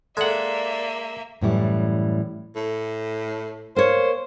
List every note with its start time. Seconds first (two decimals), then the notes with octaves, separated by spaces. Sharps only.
0.17 G#3 A#3 A4 D5 E5 F#5
1.41 F#2 A2 E3 G3
2.56 A2
3.76 A#3 C5 C#5